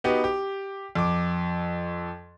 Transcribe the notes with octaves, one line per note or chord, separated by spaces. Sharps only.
B3 D#4 F#4 G4
G4
F2 D6